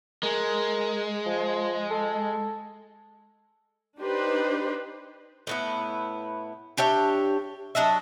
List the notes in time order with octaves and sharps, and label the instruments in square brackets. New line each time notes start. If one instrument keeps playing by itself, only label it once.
[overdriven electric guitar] G#3 [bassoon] A#4
[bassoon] F3
A4
[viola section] D4 D#4 G4 B4 C5
[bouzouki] A2 B3 E4
D4 G4 C#5 E5
F#3 D4 D#5 E5